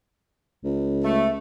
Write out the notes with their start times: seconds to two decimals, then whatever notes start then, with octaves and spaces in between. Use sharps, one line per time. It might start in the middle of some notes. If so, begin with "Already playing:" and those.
0.64 C#2
1.05 A3